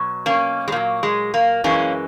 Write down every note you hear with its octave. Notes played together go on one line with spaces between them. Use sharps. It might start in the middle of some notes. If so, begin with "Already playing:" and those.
Already playing: B2 F#3
A#3 C#4
G#3
A#2 F#3 A#3
G#3
A#3
F#2 E3 G#3 A#3 C#4